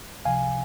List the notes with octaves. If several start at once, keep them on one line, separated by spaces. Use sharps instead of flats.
C#2 C3 F3 F5 G#5